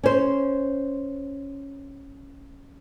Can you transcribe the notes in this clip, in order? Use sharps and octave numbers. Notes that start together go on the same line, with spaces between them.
C#4 C5